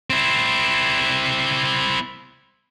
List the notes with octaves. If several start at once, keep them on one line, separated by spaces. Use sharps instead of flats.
C4 E4